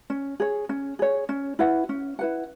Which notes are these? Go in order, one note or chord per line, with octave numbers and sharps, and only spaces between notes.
C#4
G#4 C#5
C#4
G#4 C#5
C#4
E4 B4 F#5
C#4
E4 B4 F#5